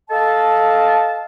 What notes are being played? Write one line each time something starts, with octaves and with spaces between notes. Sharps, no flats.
A4 D#5 F5 A5